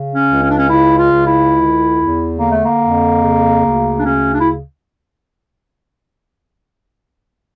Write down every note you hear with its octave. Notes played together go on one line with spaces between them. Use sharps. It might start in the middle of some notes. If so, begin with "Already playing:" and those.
Already playing: C#3
C#4
C#2
C#4
D4
C#4
C#3 E4
F4
C#2
E4
D3
E2
D3 A#3
A3
A#3
F2
C#3
D2
D4
C#3 C#4
D4
E4